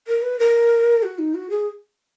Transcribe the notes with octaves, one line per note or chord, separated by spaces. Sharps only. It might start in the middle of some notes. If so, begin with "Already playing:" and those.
A#4
B4
A#4
F#4
D#4
F#4
G#4